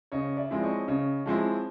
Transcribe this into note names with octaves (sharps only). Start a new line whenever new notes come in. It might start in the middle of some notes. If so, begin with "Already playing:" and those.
C#3 C#5 D#5
D5 E5
F3 G#3 C4 E4
C#5 D#5
C#3 C#5 D#5
F3 G#3 C4 E4